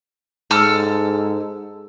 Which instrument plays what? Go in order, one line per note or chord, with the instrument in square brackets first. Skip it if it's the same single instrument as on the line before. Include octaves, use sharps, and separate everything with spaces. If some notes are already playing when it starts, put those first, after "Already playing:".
[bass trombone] G#2 [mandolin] A4 E6 F6